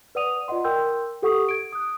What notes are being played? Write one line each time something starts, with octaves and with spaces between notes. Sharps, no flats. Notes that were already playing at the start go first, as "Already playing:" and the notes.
B4 D5 F#5 D#6 D#7 F7
F4 D5 D#5 F#5 C6
A#4 G5 C6 E6 G6
G4 A4 F#5 C#6 D#6
G#6 D7
D#6 F#6